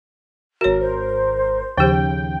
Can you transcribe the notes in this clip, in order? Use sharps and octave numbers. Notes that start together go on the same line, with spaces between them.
G#1 F#4 A#4 C#5
C5
D#2 C#3 F3 G4 G5